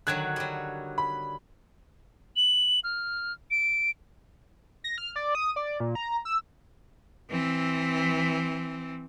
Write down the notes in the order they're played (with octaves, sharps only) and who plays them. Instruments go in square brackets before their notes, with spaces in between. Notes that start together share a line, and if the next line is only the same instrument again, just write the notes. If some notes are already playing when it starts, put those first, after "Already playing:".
[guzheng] D3 D#3 F#3 [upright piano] F#6 G#6
[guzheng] F#3 G3
[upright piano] B5
[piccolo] F#7
F6
D7
[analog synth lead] A#6
F6
D5
D#6
D5
A#2
A#5
E6
[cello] E3 C4